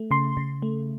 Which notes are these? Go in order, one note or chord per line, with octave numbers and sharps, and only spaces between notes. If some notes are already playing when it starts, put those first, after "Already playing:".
Already playing: A3
C#3 C6
C#3
A3